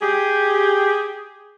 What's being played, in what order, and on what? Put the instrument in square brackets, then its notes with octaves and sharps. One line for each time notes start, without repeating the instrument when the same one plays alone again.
[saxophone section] G4 G#4